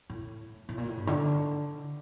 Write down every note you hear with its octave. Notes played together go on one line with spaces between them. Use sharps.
A2
A2
A#2
A2
G2
D3